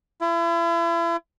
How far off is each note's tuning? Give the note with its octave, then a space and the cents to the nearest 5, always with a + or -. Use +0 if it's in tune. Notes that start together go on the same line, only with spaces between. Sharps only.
E4 +40